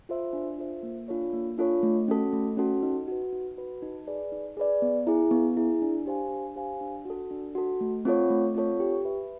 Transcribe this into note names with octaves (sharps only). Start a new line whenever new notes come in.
F4 A4 C5 E5
D4
F4 A4 C5 E5
A#3
D4 F4 A4 C#5
A#3
D4 F4 A4 C#5
A3
C#4 F#4 A4
A3
C#4 F#4 A4
D#4
F#4 B4
D#4
F#4 B4
D#4
G#4 B4 D5
D#4
G#4 B4 D5
B3
E4 G#4
B3
E4 G#4
D4
G4 C5 F5 G#5
D4
G4 C5 F5 G#5
D4
F#4 A4
D4
F#4 A4
A3
C4 F4 A4 C#5
A3
C4 F4 A4 C#5
G4
B4 E5